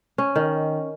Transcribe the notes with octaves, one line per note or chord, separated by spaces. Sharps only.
C#4
D#3